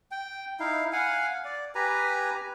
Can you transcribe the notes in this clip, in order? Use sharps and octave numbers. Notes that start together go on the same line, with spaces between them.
G5
D#4 E4 F5
F5 F#5 G#5
D5
G4 B4 G#5 A#5